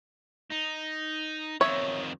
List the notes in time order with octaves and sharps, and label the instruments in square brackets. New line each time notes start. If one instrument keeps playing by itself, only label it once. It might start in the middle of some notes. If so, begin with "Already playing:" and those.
[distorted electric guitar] D#4
[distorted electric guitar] F2 D#3 [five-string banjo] C#5 E5